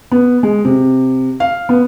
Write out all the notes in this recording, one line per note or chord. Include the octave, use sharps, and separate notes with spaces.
B3
G#3
C3
F5
B3